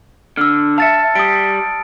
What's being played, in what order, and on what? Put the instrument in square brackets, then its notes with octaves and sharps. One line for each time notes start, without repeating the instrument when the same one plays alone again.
[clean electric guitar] D3 [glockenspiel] E6 F6
[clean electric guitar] E5 F5 [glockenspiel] A5 A6 C#7
[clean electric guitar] G3 [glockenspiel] D#6 D7